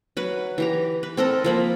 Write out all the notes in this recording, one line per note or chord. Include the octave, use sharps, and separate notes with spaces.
F#3 B4
E3 G4 A#5
B4
C4 A4 A#4 D#5
F3 A#3 B5